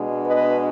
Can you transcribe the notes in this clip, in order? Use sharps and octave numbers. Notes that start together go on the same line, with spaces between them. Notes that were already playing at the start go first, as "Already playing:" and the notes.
Already playing: B2 G#3 B3 D4
B4 D#5